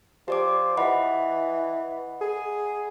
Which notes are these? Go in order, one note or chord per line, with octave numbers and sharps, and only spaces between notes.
F3 G4 D5 D6
E3 D#5 F#5 B5
G#4